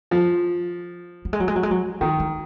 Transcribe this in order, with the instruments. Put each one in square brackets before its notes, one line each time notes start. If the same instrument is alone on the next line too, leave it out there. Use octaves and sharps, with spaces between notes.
[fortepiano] F3
[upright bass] F#3
G#3
F#3
G#3
F#3
G#3
F#3
[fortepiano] D#3 [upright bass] F3
[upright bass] F#3